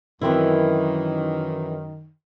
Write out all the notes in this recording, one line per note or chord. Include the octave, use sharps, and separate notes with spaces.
F#2 D#3 E3 C4 E4